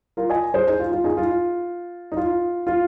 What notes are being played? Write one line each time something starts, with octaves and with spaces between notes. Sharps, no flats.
F4 A#4
D#5 G#5
G#4 C5
D#4 G#4
F4
F4
D#4 G#4
F4
D#4
F4
F4